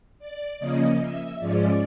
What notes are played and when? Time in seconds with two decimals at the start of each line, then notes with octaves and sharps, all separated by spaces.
0.19 D5
0.59 C#3 F3 A#3 C#4 D#5
1.00 E5
1.40 G#2 F3 G#3 C#4 D5